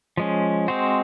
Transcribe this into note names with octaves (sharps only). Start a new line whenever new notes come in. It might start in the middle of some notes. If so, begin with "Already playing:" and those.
F3 G#3 C#4
G#3 C4 F#4 C5